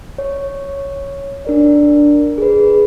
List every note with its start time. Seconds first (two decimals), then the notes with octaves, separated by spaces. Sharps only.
0.18 C#5
1.45 D4 A#4 D5
2.38 G#4 B4